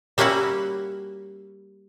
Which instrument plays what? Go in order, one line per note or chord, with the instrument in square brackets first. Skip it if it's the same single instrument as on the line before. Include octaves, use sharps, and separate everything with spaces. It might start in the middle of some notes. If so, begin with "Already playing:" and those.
[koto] G3 A#3 C#4 E4 F#4